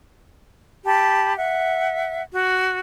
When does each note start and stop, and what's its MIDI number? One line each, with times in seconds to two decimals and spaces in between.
0.85 1.35 67
0.85 1.35 81
0.85 1.35 83
1.36 2.22 76
1.36 2.22 78
2.33 2.79 66